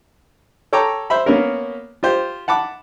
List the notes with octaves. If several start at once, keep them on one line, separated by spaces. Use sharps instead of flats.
A4 C#5 G5 A#5 D6
C5 E5 B5
A#3 B3 C#4 A#4
F4 G4 C5
F#5 A5 B5 D6